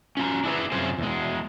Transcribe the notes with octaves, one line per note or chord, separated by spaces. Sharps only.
C#4 F4 A#5
D4 E4 G#4 B4
F#2 C3 F4 G#4 C5
E2 G#3